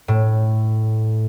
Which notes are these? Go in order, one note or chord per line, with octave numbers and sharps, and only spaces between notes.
A2